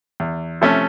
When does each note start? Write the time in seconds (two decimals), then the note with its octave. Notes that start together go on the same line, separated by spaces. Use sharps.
0.20 E2
0.61 C3 F3 A3 C#4